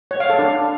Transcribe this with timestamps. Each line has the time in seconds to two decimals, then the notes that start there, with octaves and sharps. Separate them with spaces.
0.11 C#5
0.20 F5
0.30 A4
0.39 D4